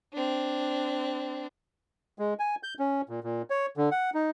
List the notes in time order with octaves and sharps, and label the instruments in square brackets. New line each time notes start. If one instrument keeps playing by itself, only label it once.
[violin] C4 D4
[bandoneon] G#3
G#5
G6
C#4
A#2
A#2
C#5
D3
F#5
D#4